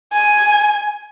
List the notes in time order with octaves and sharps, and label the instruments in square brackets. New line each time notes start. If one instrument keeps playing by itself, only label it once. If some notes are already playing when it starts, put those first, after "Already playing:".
[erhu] G#5